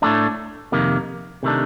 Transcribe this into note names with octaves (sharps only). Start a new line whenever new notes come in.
A2 A3 D4
F2 C3 D#3 A#3
C3 D#3 A3 D4